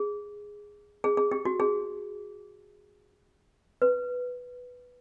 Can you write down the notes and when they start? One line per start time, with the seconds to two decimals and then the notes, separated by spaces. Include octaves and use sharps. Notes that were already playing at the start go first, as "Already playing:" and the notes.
Already playing: G#4
1.04 G#4
1.17 G#4
1.31 G4
1.45 F#4
1.60 G#4
3.82 B4